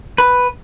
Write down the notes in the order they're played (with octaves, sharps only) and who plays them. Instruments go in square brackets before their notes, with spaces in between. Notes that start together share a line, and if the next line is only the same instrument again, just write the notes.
[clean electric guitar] B4